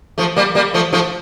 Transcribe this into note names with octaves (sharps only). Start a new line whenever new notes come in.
F3 A3
G3 A#3
G3 A#3
F3 A3
F3 A3